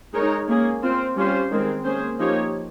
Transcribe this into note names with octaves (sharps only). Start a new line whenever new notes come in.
G#3 D#4 A#4 C#5
A#3 C#4 G#4
C4 F4 C5
G3 C#4 F4 C5
D#3 G#3 C4
A#3 C#4 G#4 C5
F3 A#3 D#4 G4 C#5